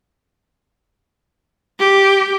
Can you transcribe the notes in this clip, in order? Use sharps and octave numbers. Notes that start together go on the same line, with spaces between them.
G4